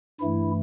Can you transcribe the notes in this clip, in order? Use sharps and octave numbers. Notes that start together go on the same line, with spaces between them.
G2 E3 A3 E4